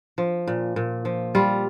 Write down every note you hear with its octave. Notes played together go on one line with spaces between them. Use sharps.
F3
A#2
A#2
F3
G3 F4